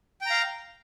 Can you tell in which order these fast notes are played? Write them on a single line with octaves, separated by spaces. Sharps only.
G5 A#5 F5